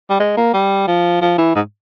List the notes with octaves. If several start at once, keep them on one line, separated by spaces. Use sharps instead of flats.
G3
G#3
A#3
G3
F3
F3
E3
G#2